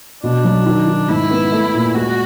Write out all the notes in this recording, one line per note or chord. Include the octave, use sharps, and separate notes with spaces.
B2 D4
F#3
D#3
D#3
G#2 E4
B3
A3
A#2
G#3 F#4